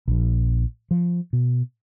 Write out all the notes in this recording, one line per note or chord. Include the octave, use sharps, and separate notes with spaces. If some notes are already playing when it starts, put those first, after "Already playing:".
A#1 F3
F3
B2